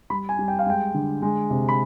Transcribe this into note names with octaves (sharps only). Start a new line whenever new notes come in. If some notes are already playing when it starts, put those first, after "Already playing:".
G3 B5
G#5
G3
G5
F5
G#3 G5
D3
G#3
C3
B5